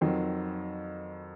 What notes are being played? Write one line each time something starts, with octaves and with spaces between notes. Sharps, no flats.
F2 D#3 F#3 C4